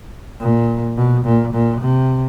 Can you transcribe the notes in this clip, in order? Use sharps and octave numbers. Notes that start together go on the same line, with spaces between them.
A#2
B2
A#2
A#2
C3